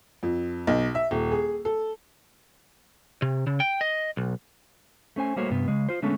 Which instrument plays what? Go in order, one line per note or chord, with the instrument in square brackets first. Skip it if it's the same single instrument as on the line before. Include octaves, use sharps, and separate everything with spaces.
[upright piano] F2
B1
E5
D#1
G#4
A4
[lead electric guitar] C3
C#3
G5
D#5
B1
[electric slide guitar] A3 C#4 C5 G#5
G3 A3 A#3 F#4 C5 C#5
G2 C3 B3
C#3 G#3
F4 C5
D3 G#3 A3 B3 C#4 A4